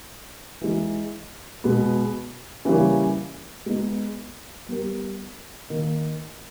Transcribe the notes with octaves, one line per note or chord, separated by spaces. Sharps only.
E3 G#3 D#4
B2 G#3 B3
C#3 E3 G3 A#3 C#4
G#3 B3 D#4
G3 B3 G4 A#4
D#3 A#3 D#4